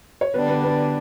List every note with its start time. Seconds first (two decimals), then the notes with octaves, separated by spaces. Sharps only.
0.21 C#5
0.34 D3 G3 B3 D4 B4
0.49 B3 B4
0.64 B3 B4